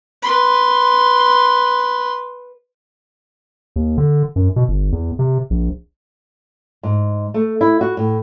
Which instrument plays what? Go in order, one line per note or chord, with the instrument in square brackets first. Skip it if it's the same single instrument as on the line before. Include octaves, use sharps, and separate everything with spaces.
[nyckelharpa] B4 C6
[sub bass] D#2
D3
F#2
B2
G1
E2
C3
A#1
[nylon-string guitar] G#2
A3
E4
F#4
A2